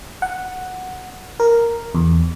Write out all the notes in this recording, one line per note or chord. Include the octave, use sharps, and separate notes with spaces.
F#5
A#4
E2